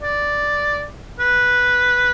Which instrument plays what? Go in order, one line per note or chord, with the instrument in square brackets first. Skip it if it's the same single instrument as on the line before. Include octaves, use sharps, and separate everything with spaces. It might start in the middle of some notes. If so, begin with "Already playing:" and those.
[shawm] D5
B4